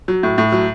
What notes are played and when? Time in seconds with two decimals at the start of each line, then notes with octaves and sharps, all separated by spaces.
0.08 F#3
0.23 A2
0.38 A2
0.52 F#3